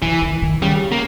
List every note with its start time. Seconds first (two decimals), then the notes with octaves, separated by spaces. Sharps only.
0.02 C#3 E3
0.22 D#3
0.42 D#3
0.62 C#3 G3
0.92 A#3